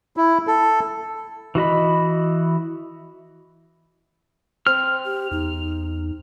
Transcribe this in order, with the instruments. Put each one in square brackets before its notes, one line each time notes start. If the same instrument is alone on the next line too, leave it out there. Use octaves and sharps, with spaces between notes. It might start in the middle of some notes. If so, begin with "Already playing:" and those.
[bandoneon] E4
A4
[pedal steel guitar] E3 F#4 D#5 B5
[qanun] C4 [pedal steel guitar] F6
[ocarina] G4
[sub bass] E2 [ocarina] D#4